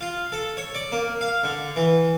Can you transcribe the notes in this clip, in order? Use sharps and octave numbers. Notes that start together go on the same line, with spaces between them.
F4
A4
C#5
D5
A#3
F5
D3
E3